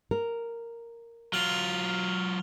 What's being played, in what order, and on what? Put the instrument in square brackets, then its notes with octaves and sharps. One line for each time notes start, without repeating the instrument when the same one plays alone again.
[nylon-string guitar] A#4
[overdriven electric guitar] F#3 F4 [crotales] F6 F7 G7